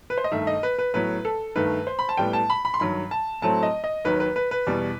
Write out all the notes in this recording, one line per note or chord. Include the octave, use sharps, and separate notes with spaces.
B4
C5
D#5
G2 D#3 A3 E5
D#5
B4
B4
A2 F#3 B3 B4
A4
G2 D#3 A3 B4
C5
B5
A5
A2 G3 B3 G5
A5
B5
B5
C6
G2 D#3 F#3 B5
A5
A2 F#3 A3 C4 A5
D#5
D#5
D#2 D#3 F#3 B4
B4
B4
B4
E2 B2 G3